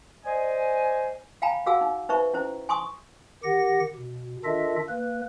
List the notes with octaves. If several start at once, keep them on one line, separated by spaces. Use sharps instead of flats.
C5 D5 D#5 G#5
F5 G5 G#5 A#5 B5
F#4 G#4 F5 F#5 G#5 E6
D#4
D#4 B4 C5 E5 A#5 C#6
C#4 E4 C5
G#5 C6 C#6 D#6
D#3 G4 F#5 A#6
B2
D#3 D4 F4 A4 D#5 E5
A#3 B4